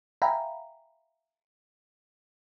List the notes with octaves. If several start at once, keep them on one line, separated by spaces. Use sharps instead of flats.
E5 F5 G5 G#5 A#5 B5